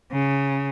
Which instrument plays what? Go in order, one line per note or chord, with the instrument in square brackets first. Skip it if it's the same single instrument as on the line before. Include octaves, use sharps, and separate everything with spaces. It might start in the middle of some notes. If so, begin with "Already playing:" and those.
[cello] C#3